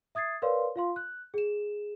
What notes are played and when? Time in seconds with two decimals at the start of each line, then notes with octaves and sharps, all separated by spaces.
0.15 E5 D#6 G#6 A6 C7
0.42 A#4 B4 C#5 D5 F5 C6
0.76 F4 F5 C6
0.96 F#6
1.34 G#4 E7